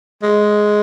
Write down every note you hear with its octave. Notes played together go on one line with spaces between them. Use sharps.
G#3